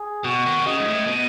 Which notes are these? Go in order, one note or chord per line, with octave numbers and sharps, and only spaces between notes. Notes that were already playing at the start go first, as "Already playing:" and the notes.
Already playing: G#4
B2 F#4
D#3
B2
C#3 D#5
G#2
A2
B2